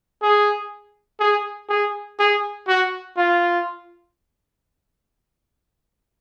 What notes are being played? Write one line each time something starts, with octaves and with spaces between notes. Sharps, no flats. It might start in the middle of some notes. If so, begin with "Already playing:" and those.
G#4
G#4
G#4
G#4
F#4
F4